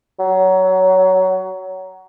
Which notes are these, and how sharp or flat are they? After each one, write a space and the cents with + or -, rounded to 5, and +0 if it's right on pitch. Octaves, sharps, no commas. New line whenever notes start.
F#3 +20